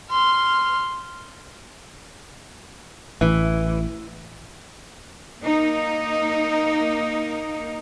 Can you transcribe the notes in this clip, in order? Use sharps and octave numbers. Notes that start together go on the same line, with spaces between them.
C6 F6
A1 E3
A#3 D#4